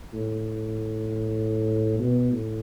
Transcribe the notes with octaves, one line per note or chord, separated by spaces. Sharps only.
A2
B2
A2